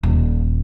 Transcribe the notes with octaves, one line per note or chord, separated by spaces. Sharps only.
D#1